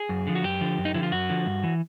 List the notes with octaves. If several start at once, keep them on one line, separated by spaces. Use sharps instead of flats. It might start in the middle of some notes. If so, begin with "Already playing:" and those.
Already playing: G#4
F#2
D3 F3
F#4
F#2 G4
D3 F3
F#2
D#4
D3 F3 E4
F4
F#2 F#4
D3 F3
G2
E3